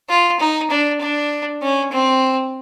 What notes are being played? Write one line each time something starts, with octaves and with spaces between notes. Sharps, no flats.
F4
D#4
D4
D4
C#4
C4